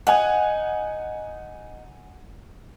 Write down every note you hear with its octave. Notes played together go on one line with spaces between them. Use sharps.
D#4 F#5 G#5